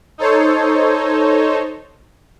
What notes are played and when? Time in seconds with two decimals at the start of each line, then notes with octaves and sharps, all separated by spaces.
0.18 D#4 A4 C5 C#5